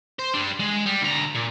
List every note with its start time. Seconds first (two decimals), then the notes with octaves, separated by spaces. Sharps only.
0.19 C5
0.34 G3 D4
0.60 G#3
0.86 G3
1.02 D2 A#5
1.35 A#2